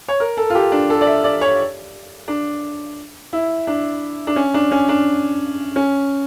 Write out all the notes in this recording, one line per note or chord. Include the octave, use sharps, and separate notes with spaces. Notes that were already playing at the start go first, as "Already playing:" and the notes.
C#5
A#4
A4
F4
G4
D4
A4
D5
E5
D5
C#5
D4
E4
D4
D4
C#4
D4
C#4
D4
C#4